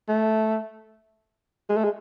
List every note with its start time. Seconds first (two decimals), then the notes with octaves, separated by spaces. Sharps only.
0.08 A3
1.69 G#3
1.77 A3
1.84 G#3